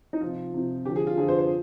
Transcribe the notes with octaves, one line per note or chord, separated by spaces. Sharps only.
D#4
C3 F3 F4
C3 F3
D3 F3 G4
G#4
F4
D3 F3 G#4
C5
C5